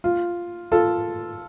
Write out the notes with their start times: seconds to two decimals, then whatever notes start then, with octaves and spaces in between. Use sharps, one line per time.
0.04 F4
0.72 F4 A4